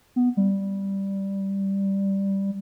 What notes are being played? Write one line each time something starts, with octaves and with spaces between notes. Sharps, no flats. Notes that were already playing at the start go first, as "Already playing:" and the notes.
B3
G3